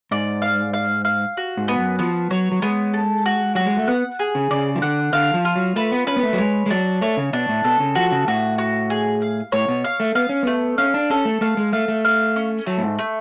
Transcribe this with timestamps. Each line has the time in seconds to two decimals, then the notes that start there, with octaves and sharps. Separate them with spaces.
0.11 G#2 D5
0.42 F5
0.73 F5
1.05 F5
1.37 F#4
1.57 G#2
1.68 B3
1.79 F#2
1.99 F3 B3
2.31 F#3 C#5
2.52 F#3
2.62 G#3 B3
2.94 A4
3.26 F#4
3.55 F#3 F#4
3.66 G#3
3.77 A3
3.88 B3 F#5
4.19 G#4
4.35 C#3
4.51 C#3 D5
4.76 F3
4.82 D3 F#5
5.13 D3 F5
5.34 F3
5.45 F4
5.56 F#3
5.76 A3 B4
5.92 B3
6.07 C#4 B4
6.16 B3
6.23 A3
6.33 F#3
6.38 G#3 C#5
6.66 G#3
6.70 F#3 D4
7.01 A3 C#5
7.17 C#3
7.33 B2 D4
7.49 A2
7.65 B2 A4
7.80 C#3
7.95 F3 F#4
8.12 C#3
8.28 A2 F#4
8.58 F#4
8.90 G#4
9.22 F5
9.52 A2 C#5
9.68 B2
9.84 F5
10.00 A3
10.15 B3 F5
10.29 C#4
10.43 A3 B3
10.78 C#4 F5
10.94 D4
11.10 C#4 A4
11.25 A3
11.41 A3 F5
11.57 G#3
11.73 A3 F5
11.88 A3
12.05 F5
12.36 C#4
12.66 F#3 A3
12.78 A2
12.83 G#2
12.99 A3